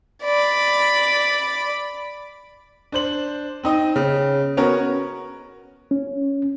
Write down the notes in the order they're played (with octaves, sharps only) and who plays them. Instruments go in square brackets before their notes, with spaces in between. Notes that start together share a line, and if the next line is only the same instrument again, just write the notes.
[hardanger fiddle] D5 B5
[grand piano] D4 C5 F#7
C4 D#4 D#5
C#3
B3 C#4 F#4 A#4
[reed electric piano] C#4